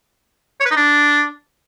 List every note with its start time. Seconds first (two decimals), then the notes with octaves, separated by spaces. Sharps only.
0.60 C#5
0.66 B4
0.71 D#4
0.76 D4